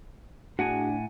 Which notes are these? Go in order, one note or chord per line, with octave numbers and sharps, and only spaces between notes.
A2 D4 F#4 G#4 F#5 G#5